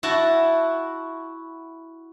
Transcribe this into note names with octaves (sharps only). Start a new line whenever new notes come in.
E4 F#4 A5